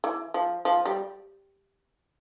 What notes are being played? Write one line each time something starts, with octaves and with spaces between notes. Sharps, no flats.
E3
F3
F3
G3